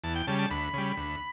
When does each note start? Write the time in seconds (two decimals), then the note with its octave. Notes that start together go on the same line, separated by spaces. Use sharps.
0.04 E2 A5
0.16 G5
0.27 C#3 G3 A5
0.39 A5
0.50 D2 B5
0.74 C#3 G3
0.97 D2